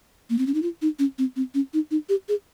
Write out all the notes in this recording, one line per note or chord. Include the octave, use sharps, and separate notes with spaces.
A#3
C4
C#4
D#4
F4
D#4
C#4
C4
C4
C#4
D#4
D#4
G4
G#4